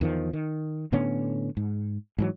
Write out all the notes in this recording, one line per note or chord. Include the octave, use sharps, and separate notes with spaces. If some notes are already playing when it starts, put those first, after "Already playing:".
E2 D#3 F3
D#3
A2 D3 B3 C#4
G#2
G#2 E3 F#3